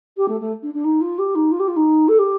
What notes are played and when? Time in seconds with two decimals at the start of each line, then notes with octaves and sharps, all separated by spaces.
0.17 G4
0.28 A3
0.41 A3
0.63 D4
0.74 D4
0.84 D#4
1.01 F4
1.19 G4
1.35 D#4
1.52 F4
1.60 G4
1.68 F4
1.76 D#4
2.08 A4
2.19 G4